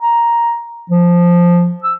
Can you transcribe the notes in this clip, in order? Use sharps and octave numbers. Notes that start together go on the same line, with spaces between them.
A#5
F3
E6